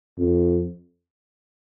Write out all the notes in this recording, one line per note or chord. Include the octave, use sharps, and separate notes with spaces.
F2